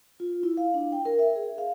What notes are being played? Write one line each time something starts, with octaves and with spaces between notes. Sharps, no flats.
F4
E4
F5
D4
G5
A#4
E5
G#4
F5